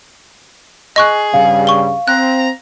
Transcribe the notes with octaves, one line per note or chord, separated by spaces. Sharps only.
G#4 D#5 C#6 F#6
G2 C#3 G3 F5
C#6 G7
C4 A#5 F#6